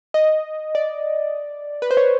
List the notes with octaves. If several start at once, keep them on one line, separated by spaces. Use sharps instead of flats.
D#5
D5
B4
C5
C#5